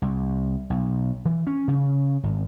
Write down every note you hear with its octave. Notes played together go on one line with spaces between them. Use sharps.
C2
B1
E3
C#4
C#3
G#1